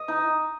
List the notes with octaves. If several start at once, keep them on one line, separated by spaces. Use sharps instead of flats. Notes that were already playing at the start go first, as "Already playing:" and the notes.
Already playing: D#5
D#4